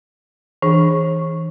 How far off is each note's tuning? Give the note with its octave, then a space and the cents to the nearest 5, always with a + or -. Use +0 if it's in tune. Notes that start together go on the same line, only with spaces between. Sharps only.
E3 -15 D4 +15 G#4 +0